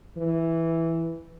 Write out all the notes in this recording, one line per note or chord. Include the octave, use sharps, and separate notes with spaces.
E3